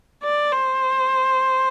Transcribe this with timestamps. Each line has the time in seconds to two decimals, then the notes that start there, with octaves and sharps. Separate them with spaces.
0.23 D5
0.52 C5